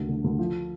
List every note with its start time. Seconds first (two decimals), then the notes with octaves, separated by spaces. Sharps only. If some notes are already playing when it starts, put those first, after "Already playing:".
Already playing: D2 G3 A3
0.09 D3
0.24 D2
0.39 F3